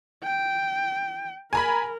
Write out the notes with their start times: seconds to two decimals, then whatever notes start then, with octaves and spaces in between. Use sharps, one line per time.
0.24 G5
1.53 A#4 G#5 A#5 B5